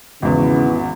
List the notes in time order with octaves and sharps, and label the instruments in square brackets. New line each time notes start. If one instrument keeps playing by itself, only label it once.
[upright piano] G#1 E2 [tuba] C#3 [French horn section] E3 B3